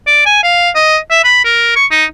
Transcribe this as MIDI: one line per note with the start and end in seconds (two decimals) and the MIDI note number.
0.07 0.25 74
0.26 0.42 80
0.43 0.70 77
0.75 0.97 75
1.10 1.21 76
1.24 1.40 83
1.45 1.72 70
1.76 1.86 85
1.91 2.05 63